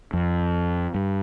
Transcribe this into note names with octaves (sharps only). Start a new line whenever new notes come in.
F2
G2